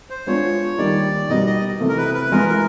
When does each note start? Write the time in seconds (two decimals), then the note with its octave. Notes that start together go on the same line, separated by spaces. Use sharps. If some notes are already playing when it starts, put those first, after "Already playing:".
0.10 C5
0.27 G#3 B3 D4 F4 C#5
0.78 D#3 G3 A#3 D#4 G4 D5
1.29 B2 G3 B3 D#4 D#5
1.46 D#5
1.80 C3 E3 A3
1.89 A#4
1.98 B4
2.15 B4
2.32 E3 G#3 B3 A#4
2.49 A#4